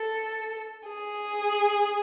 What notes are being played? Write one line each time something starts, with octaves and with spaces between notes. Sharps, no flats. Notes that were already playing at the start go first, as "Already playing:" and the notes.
Already playing: A4
G#4